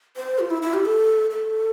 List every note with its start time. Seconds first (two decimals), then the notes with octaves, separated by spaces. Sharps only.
0.16 C5
0.39 F4
0.50 E4
0.62 E4
0.74 G4
0.85 A4
1.31 A4